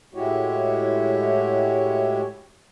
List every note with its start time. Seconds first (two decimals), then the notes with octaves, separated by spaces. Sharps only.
0.14 A2 G#3 E4 F#4 G4 C#5